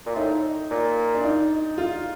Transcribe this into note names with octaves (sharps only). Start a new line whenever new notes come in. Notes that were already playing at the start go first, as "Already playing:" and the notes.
A#2
A2 D#4
A#2
D4
D#4
F4